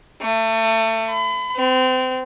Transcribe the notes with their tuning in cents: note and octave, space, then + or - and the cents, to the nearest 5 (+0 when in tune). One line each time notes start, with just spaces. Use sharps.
A3 +30
B5 +35
C4 -30